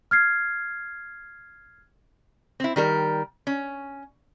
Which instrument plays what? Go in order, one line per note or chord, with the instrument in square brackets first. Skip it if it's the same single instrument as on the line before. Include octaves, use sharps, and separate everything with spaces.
[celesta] F6 G#6 C7
[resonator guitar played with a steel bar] C4 E4
D#3 G3 A#4
C#4